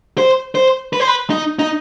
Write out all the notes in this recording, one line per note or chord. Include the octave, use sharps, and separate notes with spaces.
C5
C5
B4
C5
B4
D#4
D#4